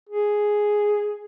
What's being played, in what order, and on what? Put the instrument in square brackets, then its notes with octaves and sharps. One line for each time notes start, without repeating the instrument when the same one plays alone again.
[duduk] G#4